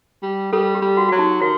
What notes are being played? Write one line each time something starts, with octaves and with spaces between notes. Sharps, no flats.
G3
G3 A4
G4
G3
F#4
F#3 F#4
D#4
D#3 F#4